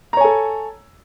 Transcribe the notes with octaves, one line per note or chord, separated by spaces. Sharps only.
A4 C#5 G#5 A#5